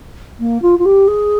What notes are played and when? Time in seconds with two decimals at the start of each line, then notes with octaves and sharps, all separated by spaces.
0.40 A#3
0.62 F4
0.79 F4
0.85 G4
1.07 G#4